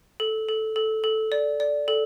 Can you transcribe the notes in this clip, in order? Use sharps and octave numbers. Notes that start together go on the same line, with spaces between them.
A4
A4
A4
A4
D5
D5
A4